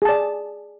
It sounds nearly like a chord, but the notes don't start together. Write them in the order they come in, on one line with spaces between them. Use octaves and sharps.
G#4 A5 D5